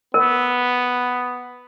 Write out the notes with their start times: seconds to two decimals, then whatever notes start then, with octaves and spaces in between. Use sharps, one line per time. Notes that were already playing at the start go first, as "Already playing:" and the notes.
0.14 B3 A#4